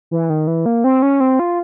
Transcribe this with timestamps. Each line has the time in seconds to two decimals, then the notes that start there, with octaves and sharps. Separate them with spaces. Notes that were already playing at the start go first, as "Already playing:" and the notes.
0.11 E3
0.30 D#3
0.47 E3
0.66 A#3
0.84 C4
1.02 C#4
1.20 C4
1.39 F4